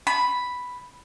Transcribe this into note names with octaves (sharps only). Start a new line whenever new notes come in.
B5